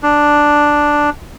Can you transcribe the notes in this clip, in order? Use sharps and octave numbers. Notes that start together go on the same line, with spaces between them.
D4